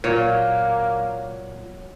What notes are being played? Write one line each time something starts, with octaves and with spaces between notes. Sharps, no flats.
A#2 F#3 A#3 C#5